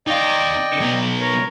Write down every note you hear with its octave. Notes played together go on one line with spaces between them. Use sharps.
D#4 D5 D#5 F5 G5
F#3 B3
A#4 C#5